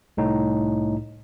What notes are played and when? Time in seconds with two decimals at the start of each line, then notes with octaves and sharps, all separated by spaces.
0.17 C2 A2 D#4